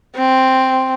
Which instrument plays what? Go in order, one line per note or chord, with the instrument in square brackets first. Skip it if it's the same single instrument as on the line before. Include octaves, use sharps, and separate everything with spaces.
[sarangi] C4